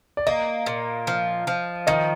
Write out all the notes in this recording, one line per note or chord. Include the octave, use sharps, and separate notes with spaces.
D5
A#3 D#5
A#2
F3
F3
D#3 D#5